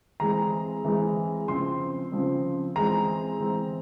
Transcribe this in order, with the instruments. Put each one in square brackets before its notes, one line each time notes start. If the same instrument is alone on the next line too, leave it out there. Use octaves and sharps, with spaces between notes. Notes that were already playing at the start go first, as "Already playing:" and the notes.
[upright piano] E3 G#3 C4 A#5
E3 G#3 C4
C#3 F3 C4 C6
C#3 F3 C4
E3 G#3 C4 A#5
E3 G#3 C4